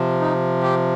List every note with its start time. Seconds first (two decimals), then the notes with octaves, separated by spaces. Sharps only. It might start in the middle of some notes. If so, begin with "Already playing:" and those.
Already playing: C3 F3
0.21 D#4
0.62 G4